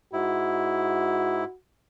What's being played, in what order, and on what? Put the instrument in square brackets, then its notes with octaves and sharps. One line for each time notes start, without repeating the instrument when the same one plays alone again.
[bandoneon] G#2 E4 [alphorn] F#4